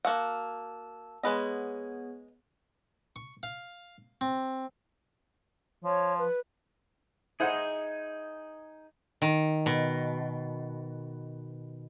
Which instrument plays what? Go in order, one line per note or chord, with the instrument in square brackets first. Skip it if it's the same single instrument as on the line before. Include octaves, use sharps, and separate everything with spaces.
[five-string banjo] A#3 F#4 F#5 [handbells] A5 E6
[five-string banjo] G#3 B4 D#5 [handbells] B3 G#4 C#5
[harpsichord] C#6
F5
C4
[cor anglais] F3 [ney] C#5
[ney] B4
[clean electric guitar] D#4 G#4 [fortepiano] E4 C5 F#5
[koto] D#3
B2